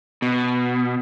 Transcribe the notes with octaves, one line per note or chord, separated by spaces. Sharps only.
B2